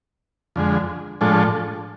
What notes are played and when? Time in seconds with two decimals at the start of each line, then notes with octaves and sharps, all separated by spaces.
0.56 F2 D3 G#3
1.21 A2 F3 G#3 D4 A4